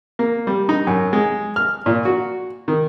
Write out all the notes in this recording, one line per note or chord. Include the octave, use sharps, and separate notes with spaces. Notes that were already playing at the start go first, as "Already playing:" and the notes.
A#3
G3
D#4
F#2
G#3
F6
A#2
F#4
D#3